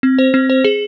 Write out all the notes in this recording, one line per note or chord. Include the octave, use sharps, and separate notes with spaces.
C4
C5
C4
C5
G#4